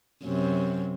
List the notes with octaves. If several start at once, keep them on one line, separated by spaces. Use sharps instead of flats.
F#2 C3